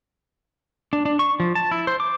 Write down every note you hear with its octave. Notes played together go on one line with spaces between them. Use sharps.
D4
D4
C#6
F3
A5
E4
C5
D6